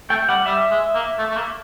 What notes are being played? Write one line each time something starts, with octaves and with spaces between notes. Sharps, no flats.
A3 G5
G3 F#5
G3 E5
G#3
A#3
A3
A3
A#3